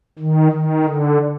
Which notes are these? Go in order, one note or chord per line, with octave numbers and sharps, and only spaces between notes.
D#3
D#3
D3